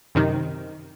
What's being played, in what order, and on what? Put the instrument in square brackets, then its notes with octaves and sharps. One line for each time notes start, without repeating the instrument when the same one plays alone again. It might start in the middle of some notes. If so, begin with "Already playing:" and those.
[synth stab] F#2 C3 D#3